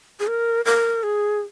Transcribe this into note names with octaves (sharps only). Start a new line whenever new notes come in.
G#4
A#4
A#4
G#4